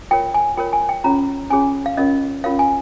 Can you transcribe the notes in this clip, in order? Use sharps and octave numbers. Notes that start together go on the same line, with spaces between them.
F4 A#4 C#5 G5
G#5
F4 A#4 C#5 G5
G#5
G5
C#4 F4 G#4 C#5 A#5
C#4 F4 G#4 C#5 G#5
F5
C#4 F4 A#4 C#5 D#5
C#4 F4 A#4 C#5 F5
G#5